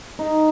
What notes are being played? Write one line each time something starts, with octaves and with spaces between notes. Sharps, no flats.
D#4